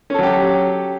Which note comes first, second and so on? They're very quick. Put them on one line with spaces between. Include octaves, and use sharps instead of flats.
C#4 A4 F#3 G4